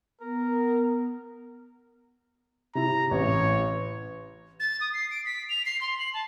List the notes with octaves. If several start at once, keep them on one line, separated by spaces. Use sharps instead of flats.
B3 A#4
C3 E4 A#5
A1 C#5
A6
D#6
C7
D7
B6
F7
C7
C6
F#7
A5